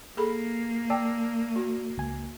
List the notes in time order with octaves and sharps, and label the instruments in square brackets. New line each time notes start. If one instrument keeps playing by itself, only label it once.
[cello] A#3 [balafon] G#4 A4 B5
[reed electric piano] D5 A5 E6 [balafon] G5
[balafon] F#4
[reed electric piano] C#2 G#5